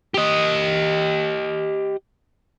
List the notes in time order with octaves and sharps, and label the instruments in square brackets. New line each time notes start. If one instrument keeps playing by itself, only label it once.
[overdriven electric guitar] G4 D#5